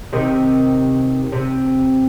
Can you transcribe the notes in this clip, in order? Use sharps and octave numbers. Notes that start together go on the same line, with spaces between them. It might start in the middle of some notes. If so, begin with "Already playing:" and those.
C3 D#3
C3